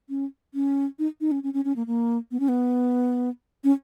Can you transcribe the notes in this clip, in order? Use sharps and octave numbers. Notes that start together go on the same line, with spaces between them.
C#4
C#4
D#4
D#4
C#4
C#4
C#4
C#4
A#3
A#3
B3
C#4
B3
C#4